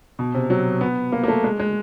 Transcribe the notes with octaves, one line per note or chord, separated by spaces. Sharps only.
B2
C3
F#3
B3
A#3
A#3
A3
G#3
G#3